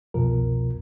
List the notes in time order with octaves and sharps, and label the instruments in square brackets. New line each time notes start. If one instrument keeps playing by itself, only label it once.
[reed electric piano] C2 F2 B2 F3 A#4